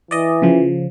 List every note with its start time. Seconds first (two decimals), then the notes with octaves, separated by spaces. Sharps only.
0.11 E3 D5 D#5
0.42 C#3 F3